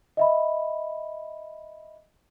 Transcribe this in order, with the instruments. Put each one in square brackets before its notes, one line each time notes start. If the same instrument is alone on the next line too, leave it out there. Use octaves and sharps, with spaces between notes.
[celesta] D#5 E5 B5